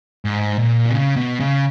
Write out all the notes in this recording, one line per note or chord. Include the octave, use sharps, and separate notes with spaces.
G#2
A#2
B2
C#3
B2
C#3